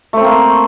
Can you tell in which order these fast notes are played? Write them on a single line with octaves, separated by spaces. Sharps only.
A3 C5 C4 A#3